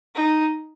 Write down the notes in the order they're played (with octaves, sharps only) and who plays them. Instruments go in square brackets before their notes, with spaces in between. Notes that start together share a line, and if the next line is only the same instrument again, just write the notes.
[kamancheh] D#4